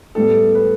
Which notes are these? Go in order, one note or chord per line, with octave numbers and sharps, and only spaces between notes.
A2 G3 B3 A4
B4